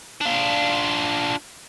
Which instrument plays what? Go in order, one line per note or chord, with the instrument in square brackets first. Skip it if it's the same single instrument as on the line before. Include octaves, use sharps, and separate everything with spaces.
[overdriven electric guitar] D4 F4